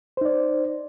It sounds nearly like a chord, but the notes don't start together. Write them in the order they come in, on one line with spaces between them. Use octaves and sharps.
C5 D#4 D5